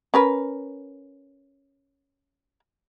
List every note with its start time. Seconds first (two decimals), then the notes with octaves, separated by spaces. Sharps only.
0.14 C#4 A#4 B4